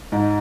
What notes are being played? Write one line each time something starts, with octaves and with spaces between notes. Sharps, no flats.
G#2